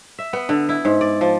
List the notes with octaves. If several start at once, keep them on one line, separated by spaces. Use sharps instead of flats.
E5
B3
D3
E4
G#2
D5
F3